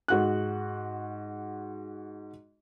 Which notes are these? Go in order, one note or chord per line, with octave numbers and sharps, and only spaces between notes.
G#2 F#4 F#6